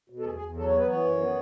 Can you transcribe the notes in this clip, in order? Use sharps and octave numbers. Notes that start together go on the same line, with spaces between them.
B2
A4
E2 G#4
G#4
E2
F#3 A4
C#5
B3
B4
E3 C#5
F#2
B3